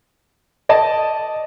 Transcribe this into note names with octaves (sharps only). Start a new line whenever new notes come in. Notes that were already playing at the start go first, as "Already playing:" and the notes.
D5 D#5 A5